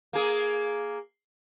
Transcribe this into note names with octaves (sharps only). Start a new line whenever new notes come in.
A#3 G#4